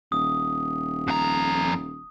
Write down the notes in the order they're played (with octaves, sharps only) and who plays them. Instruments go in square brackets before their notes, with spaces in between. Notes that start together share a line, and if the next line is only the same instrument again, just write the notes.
[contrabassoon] D#1 [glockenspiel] D#6
[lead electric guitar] F2 A#5